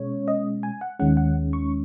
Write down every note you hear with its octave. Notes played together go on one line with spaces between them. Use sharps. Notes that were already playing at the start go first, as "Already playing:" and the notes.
Already playing: B2 G#3 C#4 C#5
D#5
G#5
F#5
D#2 D#3 G#3 C#4 F#5
F#5
C#6